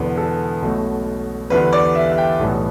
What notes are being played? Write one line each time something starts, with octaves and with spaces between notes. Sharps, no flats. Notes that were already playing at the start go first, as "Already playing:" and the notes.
Already playing: E1 E2 D3 B3 B4
A4
B1 B2 A3
E2 D3 G3 B4
D5
E5
E5
G5
B1 A2 E3 G3 B3